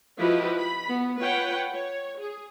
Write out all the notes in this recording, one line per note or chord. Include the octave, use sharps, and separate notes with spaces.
F3 E4 F#4 G4 B4 D#5
B5
B3
F4 B4 C#5 F#5 G5
C#5
G#4